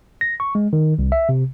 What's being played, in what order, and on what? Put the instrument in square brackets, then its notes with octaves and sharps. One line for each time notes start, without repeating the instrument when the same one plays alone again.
[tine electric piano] A#6
C#6
G#3
D#3
C2
E5
C3